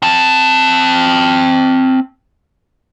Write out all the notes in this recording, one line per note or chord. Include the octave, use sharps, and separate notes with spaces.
C4 A5